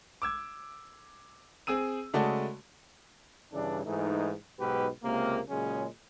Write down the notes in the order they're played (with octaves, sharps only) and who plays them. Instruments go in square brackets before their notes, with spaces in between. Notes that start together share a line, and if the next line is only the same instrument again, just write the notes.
[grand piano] D6 E6 G#6
C4 G#4 E6 D#7
C#3 G#3 A3 F#4 D5 A5
[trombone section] G2 C#3 E3 D4
G#2 E3 A3 D#4
B1 G#2 B2 G4 B4
C#2 C3 A#3
A#2 C#3 F#3 G#3 C#4